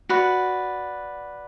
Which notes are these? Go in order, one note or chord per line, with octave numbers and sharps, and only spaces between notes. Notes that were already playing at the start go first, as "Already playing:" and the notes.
F#4 B4 D5